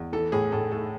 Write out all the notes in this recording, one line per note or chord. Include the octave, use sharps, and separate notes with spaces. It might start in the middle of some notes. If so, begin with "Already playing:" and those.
Already playing: E2
E3 A4
A2 G#4
A2 A4
A3 A4